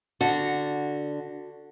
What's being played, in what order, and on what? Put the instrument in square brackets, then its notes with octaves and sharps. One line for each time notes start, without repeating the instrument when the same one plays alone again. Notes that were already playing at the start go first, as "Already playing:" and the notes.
[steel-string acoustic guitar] D3 [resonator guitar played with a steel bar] F#4